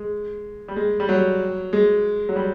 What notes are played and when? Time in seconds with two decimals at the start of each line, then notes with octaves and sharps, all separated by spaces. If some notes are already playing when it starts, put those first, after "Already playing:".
Already playing: G#3
0.68 G3
0.76 G#3
1.00 G3
1.09 F#3
1.73 G#3
2.29 F#3
2.36 G3